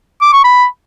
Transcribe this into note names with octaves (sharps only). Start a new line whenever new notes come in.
D6
C#6
B5